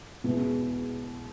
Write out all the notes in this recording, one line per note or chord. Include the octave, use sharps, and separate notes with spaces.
E2 B2 G#3 B3 E4